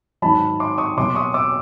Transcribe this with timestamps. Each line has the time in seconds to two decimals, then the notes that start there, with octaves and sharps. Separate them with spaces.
0.22 G#2 D#3 F#3 A5 B5
0.60 C6 D6
0.78 C#6 D#6
0.97 B2 F#3 A#3 C6 D6
1.15 C#6 D#6
1.34 D6 E6